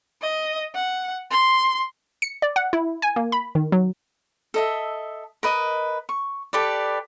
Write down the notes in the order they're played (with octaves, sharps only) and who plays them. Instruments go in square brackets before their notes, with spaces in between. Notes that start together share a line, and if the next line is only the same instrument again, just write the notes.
[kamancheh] D#5
F#5
C6
[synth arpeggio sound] C#7
D5
F#5
E4
G#5
A#3
B5
D#3
F#3
[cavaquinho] A4 D#5 E5
A#4 B4 D#5
C#6
G4 A4 B4 D5